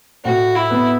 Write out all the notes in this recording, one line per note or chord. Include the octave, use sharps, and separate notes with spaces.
A2 F#4
E4
B3